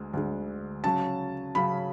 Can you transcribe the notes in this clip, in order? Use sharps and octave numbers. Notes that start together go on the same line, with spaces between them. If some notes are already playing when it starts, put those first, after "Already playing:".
Already playing: D2 D3 G#3
D2 D3 G#3
C#3 F#3 C#4 A5
C#3 F#3 C#4 B5